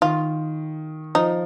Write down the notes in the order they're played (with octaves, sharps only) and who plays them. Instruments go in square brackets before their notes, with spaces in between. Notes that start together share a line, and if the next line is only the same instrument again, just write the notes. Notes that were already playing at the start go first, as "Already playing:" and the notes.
[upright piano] D#3 [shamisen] F4
[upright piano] F3 [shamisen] D#4